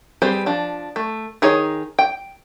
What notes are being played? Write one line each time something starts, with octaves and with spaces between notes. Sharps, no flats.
G3 C4 G#4 B4 C5
F3 D4
A3
D#3 D#4 G#4 C#5
G5